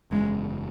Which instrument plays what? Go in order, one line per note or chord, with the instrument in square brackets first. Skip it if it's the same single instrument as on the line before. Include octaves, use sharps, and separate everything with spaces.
[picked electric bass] F#1 E2 C#3 [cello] G#3